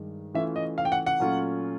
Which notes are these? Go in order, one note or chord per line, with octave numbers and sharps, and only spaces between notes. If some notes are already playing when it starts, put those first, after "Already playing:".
Already playing: G2 D#3 G#3
E3 A3 C#4 F4 E5
D#5
F5
G5
F#5
F#5
A#2 F#3 A3 C#4 F4